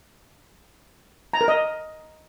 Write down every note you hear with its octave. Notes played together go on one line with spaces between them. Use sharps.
A#5
A#4
D#5